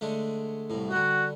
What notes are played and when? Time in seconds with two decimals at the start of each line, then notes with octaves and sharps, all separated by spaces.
0.01 D3 G#3 A3
0.70 C2 A2
0.91 D3 G3 F#4